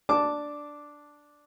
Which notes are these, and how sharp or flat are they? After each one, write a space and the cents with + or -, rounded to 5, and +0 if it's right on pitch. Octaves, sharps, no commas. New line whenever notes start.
D4 +0 A5 +0 D6 -5